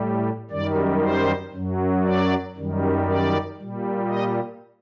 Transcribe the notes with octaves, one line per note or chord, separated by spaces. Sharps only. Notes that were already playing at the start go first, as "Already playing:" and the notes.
Already playing: A2 G3
F#2 D#3 G3 D5
C5
F#2 F#3
D5
F#2 D#3 G3
D5
A#2 G3
D#5